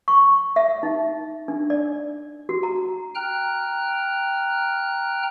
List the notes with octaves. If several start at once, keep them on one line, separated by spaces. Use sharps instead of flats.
C#6
E5
D#4
D4
D5
F#4
A#5
G5 A#5 F6 F#6